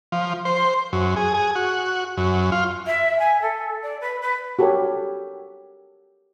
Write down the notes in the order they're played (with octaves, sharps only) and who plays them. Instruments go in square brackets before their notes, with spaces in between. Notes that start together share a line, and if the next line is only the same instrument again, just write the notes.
[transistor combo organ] F3
C5
F#2
G#4
G#4
F#4
F#2
F4
[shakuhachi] E5
G#5
A4
D5
B4
B4
[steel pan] F#4 G4 A4 A#4 C#5